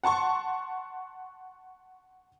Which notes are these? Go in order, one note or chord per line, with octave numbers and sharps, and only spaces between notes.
F#5 A5 C6 C#6